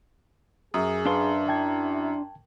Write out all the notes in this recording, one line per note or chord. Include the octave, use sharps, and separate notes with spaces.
F#2 G#4 D#6
D4 B4 F5 A5 C6
E4 G5 A5 G#6